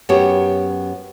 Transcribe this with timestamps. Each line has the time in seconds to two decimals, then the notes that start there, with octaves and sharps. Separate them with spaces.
0.09 F#2 B3 G4 C#5